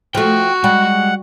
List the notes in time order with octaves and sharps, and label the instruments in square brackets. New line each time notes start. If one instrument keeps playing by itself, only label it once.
[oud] F3 A3 [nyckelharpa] F#4 [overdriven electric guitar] G5
[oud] G3 [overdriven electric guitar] G#3 [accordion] F#5